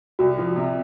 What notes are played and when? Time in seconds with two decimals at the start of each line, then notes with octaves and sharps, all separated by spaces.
0.19 C2 F#4
0.38 F3
0.56 C3